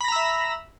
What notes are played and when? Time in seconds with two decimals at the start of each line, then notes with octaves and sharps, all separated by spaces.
0.01 B5
0.04 A#6
0.08 A#5
0.12 E6
0.16 E5